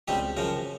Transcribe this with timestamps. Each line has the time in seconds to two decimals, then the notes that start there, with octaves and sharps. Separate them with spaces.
0.08 C#2 B2 G3 C4 G4
0.37 F#2 C#3 F3 A#4